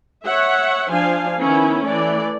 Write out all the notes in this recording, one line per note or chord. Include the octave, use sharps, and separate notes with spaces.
C#5 E5 F#5
F3 D4 C5 F5 G#5
D#3 B3 C#4 E4
E3 A3 D5